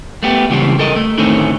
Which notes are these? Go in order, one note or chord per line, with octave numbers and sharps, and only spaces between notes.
A3 B3 G4
C#2 A#2 C#3 E3 G3 C4
A4 A#4 D#5
A3
A2 D3 D#3 A3 C4 C#4